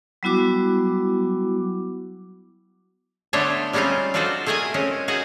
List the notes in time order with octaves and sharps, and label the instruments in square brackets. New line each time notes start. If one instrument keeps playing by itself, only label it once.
[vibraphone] F#3 G3 B3 E4 F#4 D6
[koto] D3 A3 B3 D4 C5 C#5
G3 G#3 C4 C#4 D#4 F4
D4 D#4 F4 F#4 A4 C5
A3 G#4 A#4 D#5 G#5
G#3 C4 C#4
D#4 F#4 G#4 D#5 F#5